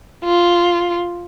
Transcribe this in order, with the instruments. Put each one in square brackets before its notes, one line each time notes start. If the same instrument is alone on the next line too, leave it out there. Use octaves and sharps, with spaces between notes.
[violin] F4